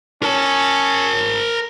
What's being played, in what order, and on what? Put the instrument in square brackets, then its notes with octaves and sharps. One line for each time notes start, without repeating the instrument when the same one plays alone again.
[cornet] C#4 [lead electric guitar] A#4 A5